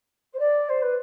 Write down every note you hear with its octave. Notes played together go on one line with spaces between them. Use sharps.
C5
D5
C5
B4